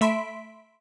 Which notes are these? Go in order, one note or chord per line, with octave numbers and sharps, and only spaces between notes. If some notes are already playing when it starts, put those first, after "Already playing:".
A3 E5 B5 C6 B6 D7